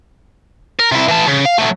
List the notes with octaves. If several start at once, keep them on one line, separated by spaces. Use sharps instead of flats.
A#4
C3 E4
E3 A5
C#3
F5
F#3 A3